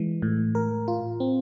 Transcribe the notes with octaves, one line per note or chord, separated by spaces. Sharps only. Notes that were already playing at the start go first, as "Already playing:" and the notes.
Already playing: E3 G#3
A2
A#4
F4
C4